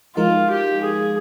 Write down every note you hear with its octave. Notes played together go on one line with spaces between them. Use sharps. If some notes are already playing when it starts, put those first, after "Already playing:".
F3 G#3 D#4 F4 A#4 F5
G4
G#4